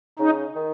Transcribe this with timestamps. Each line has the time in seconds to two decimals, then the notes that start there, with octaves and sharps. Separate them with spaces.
0.19 C#3 D#4
0.55 D#3